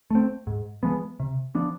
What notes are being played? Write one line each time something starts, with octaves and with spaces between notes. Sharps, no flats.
A3 C4
G#2
F3 G#3 B3
C3
F3 B3 D4